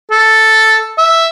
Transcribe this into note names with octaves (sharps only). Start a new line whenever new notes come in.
A4
E5